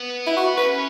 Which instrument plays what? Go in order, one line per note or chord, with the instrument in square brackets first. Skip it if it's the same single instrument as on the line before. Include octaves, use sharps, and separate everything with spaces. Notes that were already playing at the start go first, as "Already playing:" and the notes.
Already playing: [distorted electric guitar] B3
[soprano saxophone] E4
F#4
[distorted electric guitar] C#4 [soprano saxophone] B4